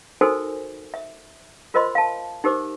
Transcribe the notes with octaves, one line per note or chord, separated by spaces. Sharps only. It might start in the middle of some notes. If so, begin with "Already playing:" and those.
D#4 F#4 A4 A#4 C5 G#5
E5
F4 A#4 C5 D#5 B5 C6
F5 A5
D#4 G4 A#4 C5 D6